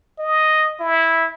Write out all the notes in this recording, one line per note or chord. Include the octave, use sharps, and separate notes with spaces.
D#5
E4